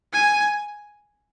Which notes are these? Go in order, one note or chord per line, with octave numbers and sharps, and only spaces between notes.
G#5